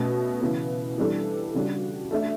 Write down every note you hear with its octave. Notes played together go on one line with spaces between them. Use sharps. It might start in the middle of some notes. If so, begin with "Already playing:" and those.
Already playing: B2 A3 C#4
C#3 E3 B3
E3 G3 D4 A4
C#3 G3 D4 F#4
A3 D4 A4 E5